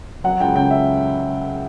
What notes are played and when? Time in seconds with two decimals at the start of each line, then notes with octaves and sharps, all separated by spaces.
0.24 F#3 F#5
0.40 C#2 G5
0.55 C#3 G5
0.71 E5